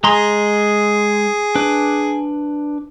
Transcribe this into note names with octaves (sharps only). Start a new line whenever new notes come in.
G#3 G#4 A#5 C6
D4 B4